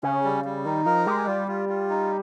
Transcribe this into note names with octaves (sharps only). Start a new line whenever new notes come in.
C#3 C#4
G3
G3
D#3 D#4
F3 A#4
G#3 G4
G3 F4
F4
F4
D#4